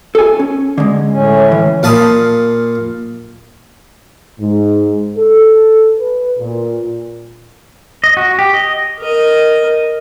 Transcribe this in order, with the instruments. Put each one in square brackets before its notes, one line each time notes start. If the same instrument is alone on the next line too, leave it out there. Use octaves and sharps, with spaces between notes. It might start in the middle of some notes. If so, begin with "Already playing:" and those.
[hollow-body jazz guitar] A4 G#5
C#4
D3 G#3
[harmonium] A2 C#4
[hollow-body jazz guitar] E3
[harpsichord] A#2 F5 A5 B5 D#6
[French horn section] G#2
A4
B4
A#2
[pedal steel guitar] D#5
F#4
G4
D#5
[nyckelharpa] A#4 D#5